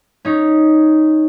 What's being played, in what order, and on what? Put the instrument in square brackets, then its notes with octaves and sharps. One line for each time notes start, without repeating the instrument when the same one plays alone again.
[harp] C#4 D#4